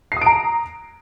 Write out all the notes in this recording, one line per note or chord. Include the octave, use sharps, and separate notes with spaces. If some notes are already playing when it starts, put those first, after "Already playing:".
A#5 D#6 C7 D7